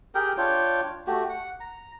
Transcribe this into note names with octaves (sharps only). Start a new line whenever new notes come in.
G4 G#4 A#4 G5
D4 F4 C#5 G5
A3 F#4 G4
F#5
A#5